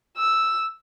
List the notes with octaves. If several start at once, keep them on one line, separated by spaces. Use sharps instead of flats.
E6